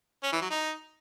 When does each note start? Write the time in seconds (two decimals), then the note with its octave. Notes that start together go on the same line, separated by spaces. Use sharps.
0.24 C#4
0.33 E3
0.42 F#3
0.51 D#4